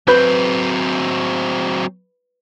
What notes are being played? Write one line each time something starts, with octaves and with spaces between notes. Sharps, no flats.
F#3 C4 B4 G6